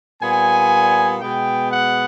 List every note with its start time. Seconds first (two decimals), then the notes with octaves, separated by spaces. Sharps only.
0.21 A#2 G3 B3 G#5
1.21 B2 G#3 B3 G5
1.72 F#5